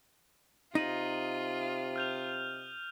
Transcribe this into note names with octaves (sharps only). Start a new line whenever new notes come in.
C3 D#4 F4 D#6 D#7 F#7
F6 G6 F7